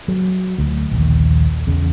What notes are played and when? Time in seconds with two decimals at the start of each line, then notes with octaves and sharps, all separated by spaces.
0.08 F#3
0.58 D2
0.91 A#1 D#2
1.67 E2 C#3